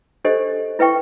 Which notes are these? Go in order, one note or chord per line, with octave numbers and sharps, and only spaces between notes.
D4 G4 A4 C5 D#5
E4 B4 E5 G5 C#6